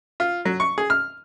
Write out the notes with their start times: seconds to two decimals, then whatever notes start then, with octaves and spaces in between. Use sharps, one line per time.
0.20 F4
0.45 F#3
0.60 C#6
0.78 G#4
0.90 F6